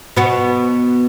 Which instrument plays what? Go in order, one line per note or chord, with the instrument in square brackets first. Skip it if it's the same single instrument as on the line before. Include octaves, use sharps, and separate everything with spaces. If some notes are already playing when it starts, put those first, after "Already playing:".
[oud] B2 B3